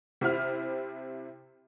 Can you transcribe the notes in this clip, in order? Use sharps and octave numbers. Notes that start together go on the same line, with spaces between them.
C3 C4 E4 F6